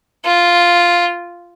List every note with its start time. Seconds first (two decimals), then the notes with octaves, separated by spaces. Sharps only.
0.25 F4